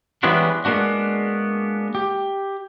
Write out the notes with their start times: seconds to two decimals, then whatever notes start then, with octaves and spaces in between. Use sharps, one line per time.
0.23 E3 G3 G#3 B3 C#4 D4
0.65 G#3 A#3 B3 D4 F#4
1.95 G4